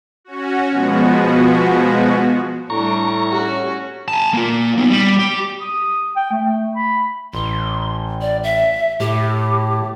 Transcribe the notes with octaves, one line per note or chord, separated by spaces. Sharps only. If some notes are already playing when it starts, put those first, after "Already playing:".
C#4 F#4
B2 F3 G#3 B3 F#4
A2 G3 D4 A#5 C#6
C#4 F#4 G4
G#5 A5
A#3 F4
B3 D#4
G3
G4
D#6
G5
A3
B5
A1 C6
D5
E5
A2 G4